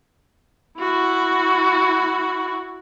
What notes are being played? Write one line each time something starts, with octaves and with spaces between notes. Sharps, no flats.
E4 F#4